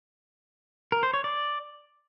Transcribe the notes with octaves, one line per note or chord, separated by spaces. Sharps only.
A#4
C5
C#5
D5